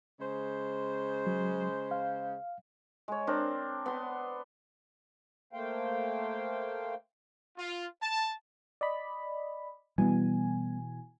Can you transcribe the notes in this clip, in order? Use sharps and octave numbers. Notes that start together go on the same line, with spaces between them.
C#3 G#3 C5
F#3
F5
G#3 C#5
C4 D4 A#4
B3 C6
A3 A#3 C5 F5 G5
F4
A5
D5 D#5 B5
B2 E3 G3 G#3 B3 G#5